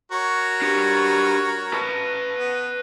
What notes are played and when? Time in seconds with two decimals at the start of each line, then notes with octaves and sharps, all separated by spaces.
0.12 F#4 A#4 C#5
0.62 D4 G4
1.73 B4 A5
2.36 B3